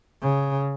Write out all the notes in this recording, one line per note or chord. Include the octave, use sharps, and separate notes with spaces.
C#3